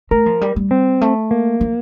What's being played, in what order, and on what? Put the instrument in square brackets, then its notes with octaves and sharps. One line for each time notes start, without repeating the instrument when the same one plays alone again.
[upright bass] A3 [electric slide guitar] A#4
[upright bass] F3
G3
G3
[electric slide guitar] C4
[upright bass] A3
[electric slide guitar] A#3
[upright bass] F3